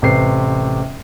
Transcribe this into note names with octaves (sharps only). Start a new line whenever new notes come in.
A1 C3 B4 C5 C7